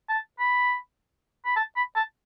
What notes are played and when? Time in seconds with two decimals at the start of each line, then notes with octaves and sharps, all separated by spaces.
0.09 A5
0.39 B5
1.45 B5
1.56 A5
1.76 B5
1.96 A5